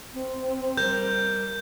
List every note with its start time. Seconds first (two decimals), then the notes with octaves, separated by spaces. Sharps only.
0.14 C4
0.77 G3 A#4 G6